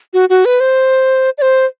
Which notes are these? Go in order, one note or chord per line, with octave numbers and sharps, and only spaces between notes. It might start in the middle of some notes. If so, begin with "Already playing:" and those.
F#4
F#4
B4
C5
D5
C5